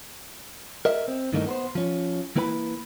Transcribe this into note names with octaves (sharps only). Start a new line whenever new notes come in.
A#4 D#5 E5
C4
G2 D#3 E3 A3 A#3 D#4
B3 B4 C5
F3 C#4
E3 A#3 E4 B4 G5 B5